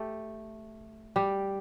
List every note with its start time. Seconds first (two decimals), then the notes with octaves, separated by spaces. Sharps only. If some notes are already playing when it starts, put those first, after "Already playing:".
Already playing: A3 G4 A4
1.16 G3 G4